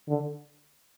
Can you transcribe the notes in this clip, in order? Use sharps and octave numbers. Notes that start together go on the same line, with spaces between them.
D3